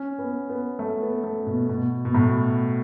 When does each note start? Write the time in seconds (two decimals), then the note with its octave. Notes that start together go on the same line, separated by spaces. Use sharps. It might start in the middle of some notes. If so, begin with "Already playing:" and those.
Already playing: C#4
0.19 B3
0.49 B3
0.79 A3
1.02 B3
1.24 A3
1.47 B2
1.69 B2
2.05 B2
2.14 A2